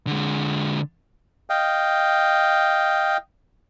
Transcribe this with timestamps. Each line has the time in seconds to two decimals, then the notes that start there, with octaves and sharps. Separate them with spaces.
0.07 D3 G#3
1.50 D#5 F5 G5